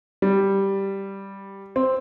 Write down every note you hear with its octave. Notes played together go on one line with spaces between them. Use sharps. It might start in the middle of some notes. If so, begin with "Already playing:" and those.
G3
C4